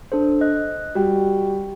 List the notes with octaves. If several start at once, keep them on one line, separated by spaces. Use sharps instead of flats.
D4 A4 C5
D#5 F#6
G3 F#4 G5